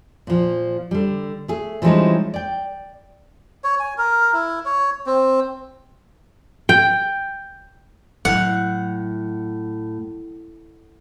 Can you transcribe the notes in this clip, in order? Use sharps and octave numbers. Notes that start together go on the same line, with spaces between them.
A#2 F3
D3 G3
A3 G#4
E3 F3 G3 G#3 C#4 D#4
D5 G5
C#5
G#5
A#4
E4
C#5
C4
G5
A2 F#3 F#5